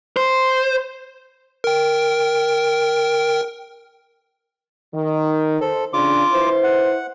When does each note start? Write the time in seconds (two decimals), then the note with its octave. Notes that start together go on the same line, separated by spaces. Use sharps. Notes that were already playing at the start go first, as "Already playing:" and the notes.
0.17 C5
1.64 A#4 G5
4.93 D#3
5.61 A4 C5
5.93 C#3 D4 F4 D6
6.32 E4 B4 C5
6.64 F#5